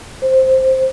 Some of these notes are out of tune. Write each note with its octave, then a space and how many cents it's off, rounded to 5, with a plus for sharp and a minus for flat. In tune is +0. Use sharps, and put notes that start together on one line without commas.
C5 +5